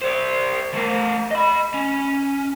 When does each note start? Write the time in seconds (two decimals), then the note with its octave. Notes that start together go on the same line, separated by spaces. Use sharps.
0.01 C5 D5
0.74 A3 A#4
1.31 D#5 B5
1.74 C#4